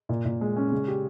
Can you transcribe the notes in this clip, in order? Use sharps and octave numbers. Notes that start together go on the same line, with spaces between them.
A#2
A#2
G#3
C#4
C#3
G4